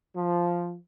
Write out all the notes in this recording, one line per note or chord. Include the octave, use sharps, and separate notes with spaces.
F3